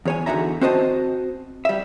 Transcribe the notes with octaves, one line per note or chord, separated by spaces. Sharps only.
E2 C#5 G#5
E2 D3 D#4 F#4 E5 A#5
C4 F#4 C5 D#5 A5
G3 E5